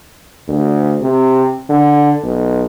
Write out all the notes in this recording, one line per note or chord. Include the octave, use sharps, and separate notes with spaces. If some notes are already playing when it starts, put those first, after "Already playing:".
D2
C3
D3
B1